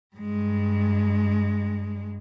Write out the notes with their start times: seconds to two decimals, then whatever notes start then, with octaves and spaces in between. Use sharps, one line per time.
0.16 G2 G#3